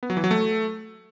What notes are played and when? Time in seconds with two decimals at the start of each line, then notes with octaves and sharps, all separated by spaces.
0.03 B3
0.10 F#3
0.17 E3
0.24 F#3
0.31 A3